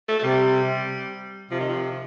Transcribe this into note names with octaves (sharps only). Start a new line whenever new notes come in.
A3
A3
C3 G3
C3 F3
D#3
F3